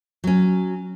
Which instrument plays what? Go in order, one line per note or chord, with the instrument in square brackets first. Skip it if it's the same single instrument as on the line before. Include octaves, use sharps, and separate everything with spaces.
[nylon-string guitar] F#3 C#4